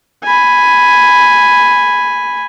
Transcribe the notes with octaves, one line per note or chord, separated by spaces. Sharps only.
G#5 B5